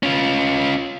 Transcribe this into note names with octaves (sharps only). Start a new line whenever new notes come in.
C#4 F4